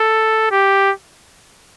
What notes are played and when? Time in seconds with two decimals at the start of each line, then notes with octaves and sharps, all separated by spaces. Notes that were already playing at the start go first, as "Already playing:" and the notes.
Already playing: A4
0.51 G4